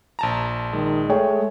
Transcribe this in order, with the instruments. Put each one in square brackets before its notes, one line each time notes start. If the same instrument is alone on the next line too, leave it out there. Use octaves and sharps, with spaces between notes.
[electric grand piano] A#1 A5 A#5
[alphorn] D#3 [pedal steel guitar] G#3
[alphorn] A3 [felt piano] G#4 C#5 G5